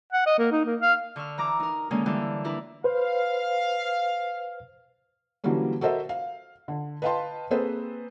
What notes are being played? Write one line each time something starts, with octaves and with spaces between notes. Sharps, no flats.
F#5
D#5
A#3
D#4
A#3
F5
D3 C#6 E6 F6
E3 A#5 D6
D#4 A#4
D3 D#3 G#3 A#3 C#4 D#4
D3 E3 G3
D4 E4 A#4 B4
B4 C5 F5
D3 E3 F#3 G3 A#3 C#4
F#4 A4 A#4 C5 D#5 E5
F5
D3
B4 D#5 F5 G5 A5 C6
A#3 C4 G#4 A4 B4 C5